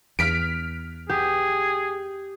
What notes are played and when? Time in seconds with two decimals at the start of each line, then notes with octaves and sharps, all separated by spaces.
0.19 E2 F6 B6 D7
1.09 G4 G#4